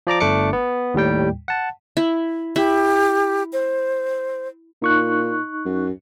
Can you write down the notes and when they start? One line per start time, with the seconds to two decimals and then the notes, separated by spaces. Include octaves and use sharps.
0.07 F3 D5 A#5 D6
0.20 G1 A3 D4 D6 C#7
0.53 B3
0.94 D#2 A2 G3 G5
1.48 F#5 A5
1.97 E4
2.56 E4 G4
3.53 C5
4.82 A#2 D#4 C#6 F#6
5.65 F#2